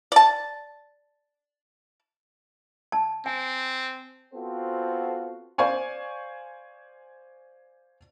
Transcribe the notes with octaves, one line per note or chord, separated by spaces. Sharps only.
D5 A5
A5
C4 G#5
B3 C4 F4 F#4 A4 C5
C5 D5 F5 G#5 C#6